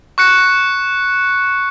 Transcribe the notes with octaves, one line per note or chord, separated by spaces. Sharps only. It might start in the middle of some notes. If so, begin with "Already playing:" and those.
C#6 F#6 C#7